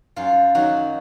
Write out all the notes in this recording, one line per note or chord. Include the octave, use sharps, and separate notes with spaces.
F#2 F4
D#3 F#3 F#4